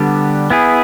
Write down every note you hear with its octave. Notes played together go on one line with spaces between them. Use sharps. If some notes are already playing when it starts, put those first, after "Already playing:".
Already playing: D3 G3 B3 D4 G4
B3 E4 G#4